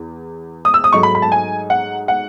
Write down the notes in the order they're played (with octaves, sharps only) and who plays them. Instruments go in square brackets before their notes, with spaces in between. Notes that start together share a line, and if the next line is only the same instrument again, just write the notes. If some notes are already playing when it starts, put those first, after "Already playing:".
Already playing: [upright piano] E2
D#6
E6
D#6
G#2 F#3 A3 D#4 C#6
B5
B5
A5
G#5
F#5
F#5